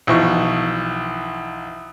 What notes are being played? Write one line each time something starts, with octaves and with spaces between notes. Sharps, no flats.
B1 E3 F3 C#6